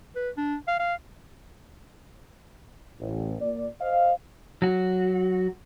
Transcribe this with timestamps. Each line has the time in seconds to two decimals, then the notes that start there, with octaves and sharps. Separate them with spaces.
0.16 B4
0.37 D4
0.68 F5
0.80 F5
2.99 A1
3.40 A#2 D5
3.80 C5 D#5 F5
4.62 F#3 F#4